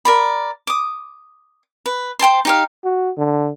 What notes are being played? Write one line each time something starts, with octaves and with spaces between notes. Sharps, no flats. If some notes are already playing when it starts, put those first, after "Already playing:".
A#4 D5 B5
D6 D#6
B4
C5 G5 A5 C6
D#4 G4 F5
F#4
D3